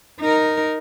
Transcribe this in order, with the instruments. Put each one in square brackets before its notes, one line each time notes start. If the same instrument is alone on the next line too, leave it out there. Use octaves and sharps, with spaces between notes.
[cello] D#4 A#4